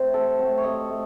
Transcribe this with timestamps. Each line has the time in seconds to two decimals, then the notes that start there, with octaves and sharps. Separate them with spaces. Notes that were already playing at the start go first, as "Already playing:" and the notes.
Already playing: A3 C4 C5
0.14 C3 A4
0.38 F#3 A3 C4
0.58 C#5
0.64 C3 D#5
0.90 A3